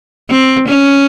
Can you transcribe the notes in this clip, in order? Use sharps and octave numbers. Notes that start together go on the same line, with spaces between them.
C4
C#4